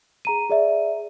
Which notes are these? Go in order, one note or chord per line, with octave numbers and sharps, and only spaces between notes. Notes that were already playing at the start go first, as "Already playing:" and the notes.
G#4 A#5 D#7
G#4 D5 E5